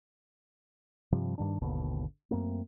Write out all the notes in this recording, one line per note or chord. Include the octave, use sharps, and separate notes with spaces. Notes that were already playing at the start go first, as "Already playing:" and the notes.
G2 C3 F3 G3
G2 D#3 D4
G#1 D#2 B2 D3
F#2 A3 A#3 C4